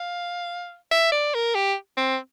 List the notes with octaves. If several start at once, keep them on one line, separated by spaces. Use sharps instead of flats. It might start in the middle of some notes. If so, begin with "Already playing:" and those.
Already playing: F5
E5
D5
A#4
G4
C4